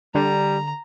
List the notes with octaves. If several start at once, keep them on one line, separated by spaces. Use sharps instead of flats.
D3 G3 A#5